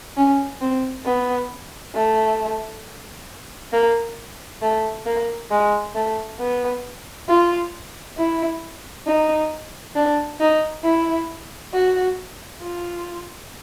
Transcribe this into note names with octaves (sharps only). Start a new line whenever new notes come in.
C#4
C4
B3
A3
A#3
A3
A#3
G#3
A3
B3
F4
E4
D#4
D4
D#4
E4
F#4
F4